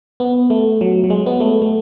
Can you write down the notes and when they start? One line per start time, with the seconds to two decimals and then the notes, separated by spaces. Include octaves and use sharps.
0.20 B3
0.50 A3
0.81 F#3
1.04 F#3
1.10 G#3
1.26 B3
1.40 A3
1.62 A3